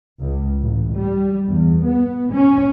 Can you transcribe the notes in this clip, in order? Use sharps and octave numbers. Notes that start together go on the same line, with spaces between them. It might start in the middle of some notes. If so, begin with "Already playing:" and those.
C#2
A1
G3
E2
B3
C#4